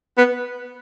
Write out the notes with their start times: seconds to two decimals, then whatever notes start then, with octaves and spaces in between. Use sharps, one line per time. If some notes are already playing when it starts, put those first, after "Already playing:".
0.18 B3